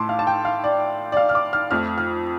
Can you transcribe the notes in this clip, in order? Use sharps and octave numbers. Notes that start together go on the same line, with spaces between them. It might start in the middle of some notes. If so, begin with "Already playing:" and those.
Already playing: A2 A3 A5 C6 D6
F5
A5
G5
F5
D5
D5
F5
F6
D6
F6
F2 F3 A3 F6
F6